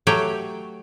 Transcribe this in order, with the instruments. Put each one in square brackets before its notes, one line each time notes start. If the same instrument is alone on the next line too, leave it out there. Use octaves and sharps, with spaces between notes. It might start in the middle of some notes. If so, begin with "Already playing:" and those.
[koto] F#3 A3 G4 C#5 G5